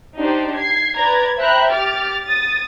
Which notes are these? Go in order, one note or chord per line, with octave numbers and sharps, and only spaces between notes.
D4 D#4 G4 C5 D5
G#6 C7
B4 D5 A#5 G#6
C5 E5 G5 A#5 B5 F#6
G4 D6 F6 A6
D#6 A6